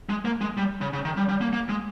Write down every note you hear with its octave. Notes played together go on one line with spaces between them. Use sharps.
G#3
A#3
G#3
G3
C#3
C#3
D#3
G3
G3
A#3
A#3
G#3